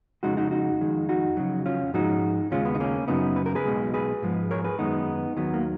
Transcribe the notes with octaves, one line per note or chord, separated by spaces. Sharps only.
F2 C#3 G#3 D#4 F#4
D#4 F#4
D#4 F#4
F2 D#3 G#3
D#4 F#4
F2 C#3 F#3
C#4 F4
G#2 F3 G#3 D#4 F#4
D#2 C#3 G#3 C#4 F4
B3
D#4
A#3 C#4
F#2 C#3 F#3 B3 D#4
B4
A#4
G#4 B4
B1 B2 G#3
G#4 B4
G#2 F3 G#3
A#4 C#5
G#4 B4
F#2 D#3 G#3 B3 D#4
D#2 D#3 F#3 B3
A#3